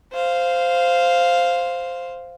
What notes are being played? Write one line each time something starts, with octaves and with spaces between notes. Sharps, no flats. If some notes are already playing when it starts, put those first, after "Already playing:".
C5 F5